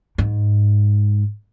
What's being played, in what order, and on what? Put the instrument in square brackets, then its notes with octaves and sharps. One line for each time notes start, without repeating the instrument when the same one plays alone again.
[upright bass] G#2